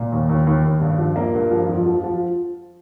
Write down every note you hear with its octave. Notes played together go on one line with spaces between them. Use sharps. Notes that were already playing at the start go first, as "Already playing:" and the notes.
Already playing: A#2
D#2
D#2
D#2
D#2
G2
F3
A#3
G2
F3
F2
F3
F3